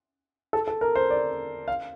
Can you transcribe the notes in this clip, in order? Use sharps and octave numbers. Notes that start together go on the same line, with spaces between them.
A4
A4
A#4
C5
D5
F5